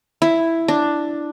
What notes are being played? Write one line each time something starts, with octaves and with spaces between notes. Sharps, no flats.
E4
D4